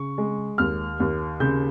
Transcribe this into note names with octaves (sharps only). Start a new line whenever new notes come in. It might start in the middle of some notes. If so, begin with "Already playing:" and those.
Already playing: C#3 C#6
G#3
D#2 F6
D#2
C#3 G6